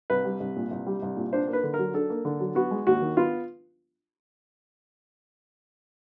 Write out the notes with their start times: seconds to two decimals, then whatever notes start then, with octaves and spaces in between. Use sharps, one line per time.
0.10 C2 B4
0.25 G3
0.40 C2
0.56 A#2
0.71 C2
0.87 G3
1.02 C2
1.17 A#2
1.33 D4 C5
1.48 A#3
1.53 B4
1.63 D3
1.74 F#3 A#4
1.94 D4 A4
2.10 A#3
2.25 D3
2.40 F#3
2.55 B3 F#4
2.71 G#3
2.87 D#2 F#4
3.01 D#3
3.17 B3 F4